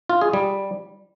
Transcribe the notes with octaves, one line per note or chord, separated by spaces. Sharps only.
F4
G#4
G3